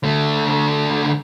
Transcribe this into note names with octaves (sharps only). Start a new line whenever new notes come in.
D3 A3